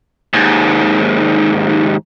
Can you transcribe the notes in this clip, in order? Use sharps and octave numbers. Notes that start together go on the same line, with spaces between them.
D#2 G#2